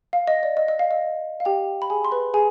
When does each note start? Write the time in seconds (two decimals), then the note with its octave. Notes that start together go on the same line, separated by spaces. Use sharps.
0.13 F5
0.27 D#5
0.43 D5
0.57 D#5
0.68 D#5
0.79 F5
0.91 D#5
1.40 F5
1.45 G4 G5
1.82 B5
1.90 G#4 G#5
2.05 C6
2.11 B4 B5
2.34 G#4 G#5